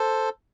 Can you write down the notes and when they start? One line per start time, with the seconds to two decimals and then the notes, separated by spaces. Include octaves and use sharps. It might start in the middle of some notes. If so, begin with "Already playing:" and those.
Already playing: A4 C5